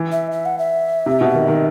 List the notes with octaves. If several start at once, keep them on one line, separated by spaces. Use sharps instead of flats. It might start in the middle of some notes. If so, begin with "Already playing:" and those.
Already playing: E3
E5
E5
F#5
E5
C3
B2
D#3
D#3